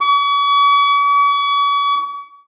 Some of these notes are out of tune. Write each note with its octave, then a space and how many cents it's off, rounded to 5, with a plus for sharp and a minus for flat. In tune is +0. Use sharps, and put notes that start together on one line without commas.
C#6 +45